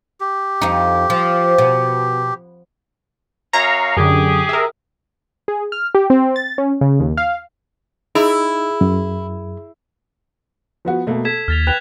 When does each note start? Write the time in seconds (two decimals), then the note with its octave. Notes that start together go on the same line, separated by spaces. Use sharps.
0.21 G4
0.62 F2 D#4
1.10 F3
1.58 B2
3.53 F#2 C#5 F5 A#5
3.97 F#2 D3 G4 G#4
4.49 A#4 E5
5.48 G#4
5.72 F6
5.95 G4
6.10 C4
6.36 A6
6.58 C#4
6.81 C#3
7.00 D#2
7.17 F5
8.15 D#4 E4 G#4
8.81 F#2
10.85 F3 B3 F#4
11.07 B2 A3 A#3
11.25 A4 G#6 B6 E7
11.48 D#2 F6 A6 F7
11.67 B4 G5 F#6 F7